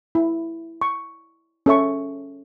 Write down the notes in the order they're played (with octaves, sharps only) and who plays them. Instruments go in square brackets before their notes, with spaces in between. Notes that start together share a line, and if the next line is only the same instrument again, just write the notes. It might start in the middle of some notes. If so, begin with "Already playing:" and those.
[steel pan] E4
C#6
C#4 A4 E5 C#6